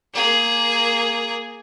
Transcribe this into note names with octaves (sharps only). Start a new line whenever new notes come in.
A#3 G#4